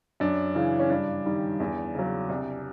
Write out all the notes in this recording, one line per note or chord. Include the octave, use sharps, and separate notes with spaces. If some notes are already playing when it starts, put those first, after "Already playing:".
F#2 D4
C#3 E3
C#4
G2 D4
D#3 G3
E2
C#3 F#3
C2